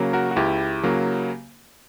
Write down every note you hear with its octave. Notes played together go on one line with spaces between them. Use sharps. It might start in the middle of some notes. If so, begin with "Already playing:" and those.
Already playing: C#3 F#3 A#3
F#4 A#4
F#4
C#2 E4 G4
C#3 F#3 A#3